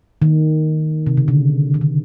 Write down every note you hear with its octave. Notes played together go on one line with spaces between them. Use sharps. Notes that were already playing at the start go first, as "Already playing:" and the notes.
D#3
C3
C#3
D3
D#3
D3